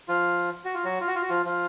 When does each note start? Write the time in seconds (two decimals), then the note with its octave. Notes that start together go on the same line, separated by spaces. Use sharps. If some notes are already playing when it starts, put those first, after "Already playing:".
0.08 F3 F4
0.65 F#4
0.75 F4
0.84 F#3 F#4
1.01 F4
1.07 F#4
1.15 F4
1.22 F#4
1.29 F3 F4
1.45 F3 F4